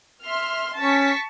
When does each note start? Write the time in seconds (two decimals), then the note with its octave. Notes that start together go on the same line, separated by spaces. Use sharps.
0.24 E5 C6 F6
0.78 C#4 A5 C#6 B6